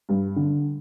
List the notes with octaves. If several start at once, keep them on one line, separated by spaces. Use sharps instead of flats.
G2
D3